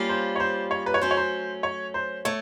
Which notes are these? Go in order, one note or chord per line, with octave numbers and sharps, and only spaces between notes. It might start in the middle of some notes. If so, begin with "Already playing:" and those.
Already playing: G3 A#3 C#4 F4
C5
C#5
C5
C#5
B4
C#5
F#3 A3 C#4 C5
C#5
C5
C#5
C5
A3 C#5